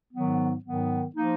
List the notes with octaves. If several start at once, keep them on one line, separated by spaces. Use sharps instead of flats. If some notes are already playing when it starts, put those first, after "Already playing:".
G#2 D#3 F#3 B3
G#2 D#3 F#3 B3
F3 A#3 D#4